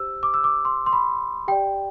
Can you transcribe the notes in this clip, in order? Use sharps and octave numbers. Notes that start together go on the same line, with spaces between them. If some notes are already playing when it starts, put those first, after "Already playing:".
Already playing: G4 C5 E6
D6
E6
D6
C6
C6
B5
G4 D5 G5